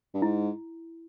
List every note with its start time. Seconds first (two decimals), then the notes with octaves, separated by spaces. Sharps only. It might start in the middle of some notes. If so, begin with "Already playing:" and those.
0.14 G2
0.22 G#2 E4